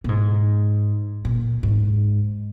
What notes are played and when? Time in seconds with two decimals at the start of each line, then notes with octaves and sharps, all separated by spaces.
0.04 A#2
0.09 G#2
1.25 A#2
1.63 G#2